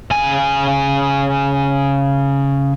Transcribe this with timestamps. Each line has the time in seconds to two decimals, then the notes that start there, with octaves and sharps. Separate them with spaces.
0.11 C#3 G#5